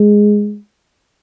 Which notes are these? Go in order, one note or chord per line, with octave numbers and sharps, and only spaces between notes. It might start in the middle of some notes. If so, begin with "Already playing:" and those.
Already playing: G#3